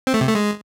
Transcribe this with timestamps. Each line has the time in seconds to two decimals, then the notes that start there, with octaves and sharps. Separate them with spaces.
0.07 C4
0.14 A3
0.21 C3
0.28 A3
0.35 G#3